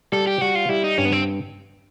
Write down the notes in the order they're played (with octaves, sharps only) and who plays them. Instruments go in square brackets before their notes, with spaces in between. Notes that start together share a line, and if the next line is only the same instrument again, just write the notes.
[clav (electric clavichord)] G3 [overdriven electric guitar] A4
[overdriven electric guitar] G4
[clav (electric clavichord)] G3 [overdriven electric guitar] F#4
[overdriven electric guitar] F4
[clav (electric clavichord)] G3 [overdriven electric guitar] E4
[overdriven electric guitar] D#4
[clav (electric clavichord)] G2 [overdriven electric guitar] C#4
[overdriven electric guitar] B3
C4